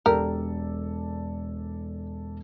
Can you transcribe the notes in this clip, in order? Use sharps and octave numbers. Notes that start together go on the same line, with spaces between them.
E1 G4 A4 A#4 D5